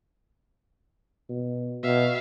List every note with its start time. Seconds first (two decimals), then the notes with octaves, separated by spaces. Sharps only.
1.29 B2
1.83 B2 E5 F5